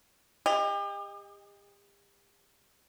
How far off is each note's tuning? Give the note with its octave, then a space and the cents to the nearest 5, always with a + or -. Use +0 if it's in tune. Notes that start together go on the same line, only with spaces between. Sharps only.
G4 +40 D#5 +0